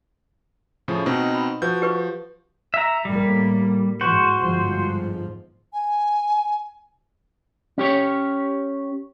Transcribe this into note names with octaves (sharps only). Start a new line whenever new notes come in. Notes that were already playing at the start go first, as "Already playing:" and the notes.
A2 C#3 F3
B2 C4 D#4
B5
F3 F#4 B4 G6
G4 B4 C#6
E5 A#5
A2 G3 A#3
G#2 E3 F#4 C5
G1 G#2 F3
G#5
C#4 G4 C#5